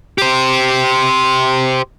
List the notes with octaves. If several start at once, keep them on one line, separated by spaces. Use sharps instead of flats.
G4 C5